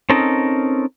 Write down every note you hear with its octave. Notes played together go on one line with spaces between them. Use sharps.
C4 C#4 D#4 A4 A#4 D#5